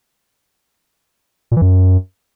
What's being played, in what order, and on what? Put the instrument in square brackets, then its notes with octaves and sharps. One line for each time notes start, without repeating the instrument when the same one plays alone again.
[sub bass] A#2
E3
F#2